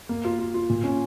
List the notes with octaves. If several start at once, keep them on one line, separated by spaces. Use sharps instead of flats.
A#3
F4
F4
F4
A#2
C#4